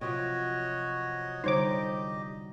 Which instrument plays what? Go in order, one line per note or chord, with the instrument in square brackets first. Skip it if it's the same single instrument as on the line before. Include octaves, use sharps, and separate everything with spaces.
[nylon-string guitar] C3 F3 F#3 [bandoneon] F#4 C#5 D#5
[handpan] D3 G3 D#4 [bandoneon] G4 D#5 [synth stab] C5 C#5 D6